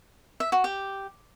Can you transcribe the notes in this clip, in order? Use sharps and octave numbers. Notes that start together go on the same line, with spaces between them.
E5
F#4
G4